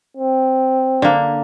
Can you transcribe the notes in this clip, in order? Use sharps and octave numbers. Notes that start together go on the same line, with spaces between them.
C4
D3 A#3